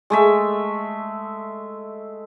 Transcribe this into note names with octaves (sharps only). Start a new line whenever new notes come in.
G#3 A3 E5